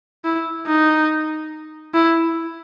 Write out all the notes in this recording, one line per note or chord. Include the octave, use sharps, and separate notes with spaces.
E4
D#4
E4